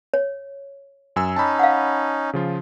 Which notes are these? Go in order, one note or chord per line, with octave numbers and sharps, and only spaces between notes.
C#5
F#2 G#5 E6
C#4 D#4 A5 B5
F5 F#5
C#3 F3 F4